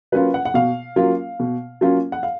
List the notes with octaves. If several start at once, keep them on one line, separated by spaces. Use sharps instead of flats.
F#3 A#3 C#4 F4 B4
F#5
F#5
B2 F5
F#3 A#3 C#4 F4
B2
F#3 A#3 C#4 F4
F#5
F5